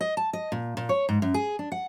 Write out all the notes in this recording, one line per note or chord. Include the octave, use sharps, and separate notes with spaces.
D#5
A5
D#5
A#2
A#2
C#5
G#2
F#2
G#4
D4
F#5